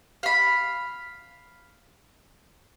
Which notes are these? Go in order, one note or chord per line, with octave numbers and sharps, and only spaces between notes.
F5 B5